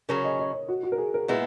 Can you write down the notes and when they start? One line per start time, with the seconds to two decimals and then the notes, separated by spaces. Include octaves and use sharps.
0.09 C#3 F#3 C#4 G#4 A#4
0.24 D#5
0.39 D#5
0.53 C#5
0.68 F#4
0.83 F#4
0.92 A#4
0.98 G#4
1.14 A#4
1.28 A#2 G#3 B3 E4 B4